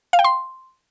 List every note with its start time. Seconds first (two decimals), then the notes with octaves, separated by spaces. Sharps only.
0.13 F5
0.19 G5
0.24 C6